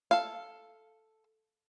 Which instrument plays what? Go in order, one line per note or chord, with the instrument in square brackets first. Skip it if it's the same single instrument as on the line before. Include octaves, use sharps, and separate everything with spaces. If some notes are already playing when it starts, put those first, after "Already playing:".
[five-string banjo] A4 F5